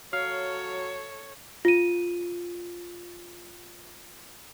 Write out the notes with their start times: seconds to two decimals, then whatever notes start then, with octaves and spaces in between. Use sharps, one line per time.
0.13 F#3 A4 C#5 F5
1.65 F4 D#7